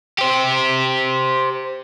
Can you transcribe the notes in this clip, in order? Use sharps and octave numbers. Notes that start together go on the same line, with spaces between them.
G4 C5